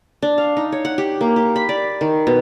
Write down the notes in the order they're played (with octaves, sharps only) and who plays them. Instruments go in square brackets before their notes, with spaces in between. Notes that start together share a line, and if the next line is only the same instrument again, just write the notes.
[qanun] D4
F5
D#4
C#5
F#5
G4
A#3
G4
B5
D5
D#3
B2